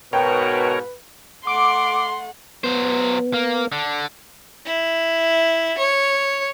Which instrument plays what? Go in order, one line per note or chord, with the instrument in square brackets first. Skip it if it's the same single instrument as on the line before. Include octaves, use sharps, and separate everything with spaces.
[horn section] G#2 B2 [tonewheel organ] A#4 C#5 [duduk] B4 [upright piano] G5
[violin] A3 F#5 [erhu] C6 [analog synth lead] D6
[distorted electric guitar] F#3 C5 [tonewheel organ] B3
[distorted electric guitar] A#3
D3
[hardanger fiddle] E4
C#5